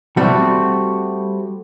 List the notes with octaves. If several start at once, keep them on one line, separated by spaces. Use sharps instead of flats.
G3 A3 C4 F#4